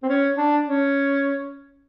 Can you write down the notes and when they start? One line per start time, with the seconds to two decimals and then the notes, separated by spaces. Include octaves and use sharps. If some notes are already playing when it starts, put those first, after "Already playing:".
0.03 C4
0.09 C#4
0.37 D4
0.66 C#4